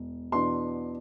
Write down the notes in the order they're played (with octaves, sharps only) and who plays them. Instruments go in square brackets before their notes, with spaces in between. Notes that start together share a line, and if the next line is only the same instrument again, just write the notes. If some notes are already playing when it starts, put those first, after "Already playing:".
Already playing: [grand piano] E1
E2 B2 B3 D4 C6